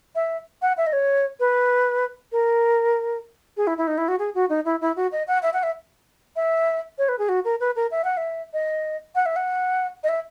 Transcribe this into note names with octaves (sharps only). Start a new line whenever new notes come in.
E5
F#5
E5
D#5
C#5
B4
A#4
G#4
E4
E4
D#4
E4
F#4
G#4
F#4
D#4
E4
E4
F#4
D#5
F#5
E5
F#5
E5
E5
C#5
B4
G#4
F#4
A#4
B4
A#4
E5
F#5
E5
D#5
F#5
E5
F#5
D#5
E5